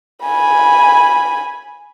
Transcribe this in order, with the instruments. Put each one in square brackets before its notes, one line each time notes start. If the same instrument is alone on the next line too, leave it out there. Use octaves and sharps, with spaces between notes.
[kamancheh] G#5 B5